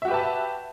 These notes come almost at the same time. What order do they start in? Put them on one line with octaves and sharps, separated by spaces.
E5 F#4 G4 B4 A5